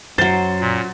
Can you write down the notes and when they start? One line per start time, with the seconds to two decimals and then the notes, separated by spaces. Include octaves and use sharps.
0.18 F#2 F#3 C5 A6
0.60 A#2